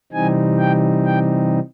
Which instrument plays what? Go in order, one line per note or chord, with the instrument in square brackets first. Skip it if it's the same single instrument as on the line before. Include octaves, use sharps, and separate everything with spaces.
[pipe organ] C3 E3 G3 C4 D#4 G#5
G5
G5